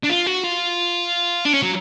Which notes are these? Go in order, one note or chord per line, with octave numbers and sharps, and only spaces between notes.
D4
F4
F#4
F4
D4
C#4
F#3